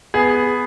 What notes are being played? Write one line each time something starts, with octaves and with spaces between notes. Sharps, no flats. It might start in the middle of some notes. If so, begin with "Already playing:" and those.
B3 G#4